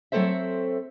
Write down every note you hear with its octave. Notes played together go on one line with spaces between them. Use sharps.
F#3 A3 C4 A4 C5 E5